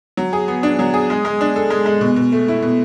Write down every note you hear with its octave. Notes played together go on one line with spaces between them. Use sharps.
F#3
G#4
B3
D4
F#3
G#4
G#3
G#3
D4
A4
G#3
G#3
B2
B2
A3
E4
B2